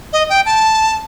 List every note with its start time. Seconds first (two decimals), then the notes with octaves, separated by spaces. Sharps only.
0.13 D#5
0.30 G5
0.46 A5